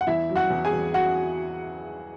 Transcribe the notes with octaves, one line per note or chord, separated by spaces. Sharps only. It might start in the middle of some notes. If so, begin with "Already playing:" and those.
F#5
E2 E4 E5
F#3
F#4 F#5
E2
G#4 G#5
E2
F#4 F#5